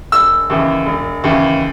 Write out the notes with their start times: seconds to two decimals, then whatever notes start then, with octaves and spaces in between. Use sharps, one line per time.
0.12 E1 E6
0.50 D#2 C#3 E3
0.86 E1
1.24 D#2 C#3 E3